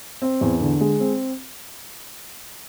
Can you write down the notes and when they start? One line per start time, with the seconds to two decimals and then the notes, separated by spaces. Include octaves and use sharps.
0.22 C4
0.41 E2
0.61 D3
0.81 G#3
1.00 C4